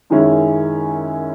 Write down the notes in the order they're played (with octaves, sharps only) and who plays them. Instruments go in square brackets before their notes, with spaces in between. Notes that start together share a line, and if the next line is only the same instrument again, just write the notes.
[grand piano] F#2 D#3 G#3 C#4 E4